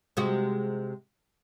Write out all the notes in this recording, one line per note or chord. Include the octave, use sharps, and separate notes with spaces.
C3 G#3 F#4